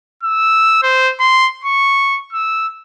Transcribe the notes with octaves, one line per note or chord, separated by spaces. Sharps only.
E6
C5
C6
C#6
E6